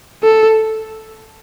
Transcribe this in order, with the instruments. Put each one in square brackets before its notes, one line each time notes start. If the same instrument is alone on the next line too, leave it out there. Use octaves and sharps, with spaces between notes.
[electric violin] A4